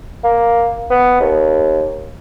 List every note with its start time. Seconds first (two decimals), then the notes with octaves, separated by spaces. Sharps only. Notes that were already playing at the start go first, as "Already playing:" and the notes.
0.24 A#3
0.90 B3
1.21 D#2